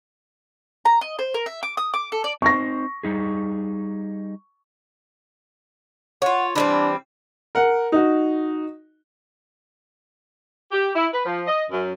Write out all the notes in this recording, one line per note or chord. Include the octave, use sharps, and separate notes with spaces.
A#5
D#5
C5
A#4
E5
D6
D#6
D6
A4
D5
C4 D#4 C5 C#6 A#6
G3 D#4 G#4
F4 C#5 F#5
E3 G3 C4 D4
A#4 F#5
D#4 F#4
G4
E4
B4
F3
D#5
F#2